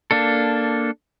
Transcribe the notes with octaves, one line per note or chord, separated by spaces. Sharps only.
A#3 D4 A4